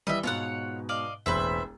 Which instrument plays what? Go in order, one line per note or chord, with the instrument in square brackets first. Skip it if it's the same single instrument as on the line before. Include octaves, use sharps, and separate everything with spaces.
[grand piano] E3 G3 [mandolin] D#5 E5
[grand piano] G#2 B2 [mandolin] F4 C#5 F#5
[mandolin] D5 D#5 F5
[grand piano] E1 A1 [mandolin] B4 C5 E5